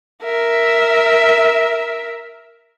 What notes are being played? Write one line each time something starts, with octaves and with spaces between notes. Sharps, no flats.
A#4 E5